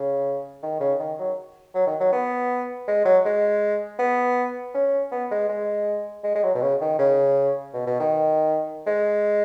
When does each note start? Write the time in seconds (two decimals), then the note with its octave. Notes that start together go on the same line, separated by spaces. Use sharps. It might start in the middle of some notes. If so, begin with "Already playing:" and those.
Already playing: C#3
0.62 D#3
0.80 C#3
0.99 D#3
1.19 F#3
1.74 F#3
1.86 D#3
2.00 F#3
2.12 B3
2.88 G#3
3.05 F#3
3.25 G#3
3.99 B3
4.74 C#4
5.12 B3
5.31 G#3
5.49 G#3
6.24 G#3
6.35 G#3
6.43 F#3
6.54 B2
6.62 C#3
6.81 D#3
6.99 C#3
7.74 B2
7.87 B2
8.00 D#3
8.87 G#3